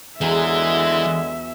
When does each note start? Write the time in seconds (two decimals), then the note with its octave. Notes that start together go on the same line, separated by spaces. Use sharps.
0.21 E2 D3 E3 F#3 G#3 E5